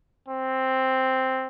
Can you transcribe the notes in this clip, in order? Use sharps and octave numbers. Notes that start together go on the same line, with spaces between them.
C4